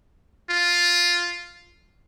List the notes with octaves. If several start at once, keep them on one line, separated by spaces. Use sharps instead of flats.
F4